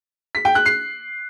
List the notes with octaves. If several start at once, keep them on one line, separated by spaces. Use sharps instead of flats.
B6
G5
F#6
C7